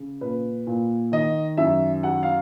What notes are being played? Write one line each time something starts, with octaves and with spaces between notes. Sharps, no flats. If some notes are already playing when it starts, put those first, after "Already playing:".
Already playing: C#3
A#2 B4
A#2
D#3 D#5
F#2 E5
F#3 F#5
F5